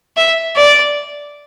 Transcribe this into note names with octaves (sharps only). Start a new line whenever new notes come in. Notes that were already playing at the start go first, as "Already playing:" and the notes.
E5
D5